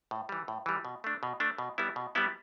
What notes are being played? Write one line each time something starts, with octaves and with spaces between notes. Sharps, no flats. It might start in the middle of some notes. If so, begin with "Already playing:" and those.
A2
E3 G3
A2
E3 G3
B2
A3 D4
B2
A3 D4
B2
G3 B3 E4
B2
G3 B3 E4